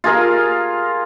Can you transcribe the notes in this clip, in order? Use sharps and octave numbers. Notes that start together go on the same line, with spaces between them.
F4 G#4 A#4 F5